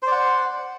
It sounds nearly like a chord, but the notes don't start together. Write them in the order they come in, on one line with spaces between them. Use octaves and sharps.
C5 D5 F#5